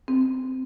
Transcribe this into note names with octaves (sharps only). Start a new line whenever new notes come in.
C4